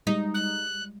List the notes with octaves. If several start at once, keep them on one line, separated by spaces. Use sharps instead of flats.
G3 G#3 D#4
F#6